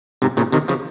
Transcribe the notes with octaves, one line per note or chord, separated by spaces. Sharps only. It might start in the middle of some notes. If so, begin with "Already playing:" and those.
G#2 C3
A#2 C#3
C3 D#3
C#3 F3